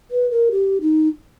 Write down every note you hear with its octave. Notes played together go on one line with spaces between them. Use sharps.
B4
A#4
G4
D#4